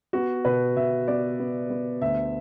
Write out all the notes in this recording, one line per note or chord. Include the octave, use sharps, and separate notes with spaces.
B3 F#4
B2 B4
B2 E5
B3 D5
B3
B3
D2 E5